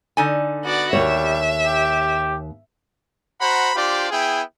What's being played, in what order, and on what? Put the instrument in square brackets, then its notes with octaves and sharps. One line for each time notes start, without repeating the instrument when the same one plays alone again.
[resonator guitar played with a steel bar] D3 D#4 G#5
[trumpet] B3 [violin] F#4 D5
[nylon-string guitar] D#2 G#2 C#5 [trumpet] G3 [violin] E5
[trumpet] G4
[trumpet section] F#4 C5 F#5 A#5 B5
D4 F4 G4 C5 D5
B3 E4 G#4 G5